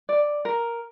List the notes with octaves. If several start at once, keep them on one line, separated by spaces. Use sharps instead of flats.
D5
A#4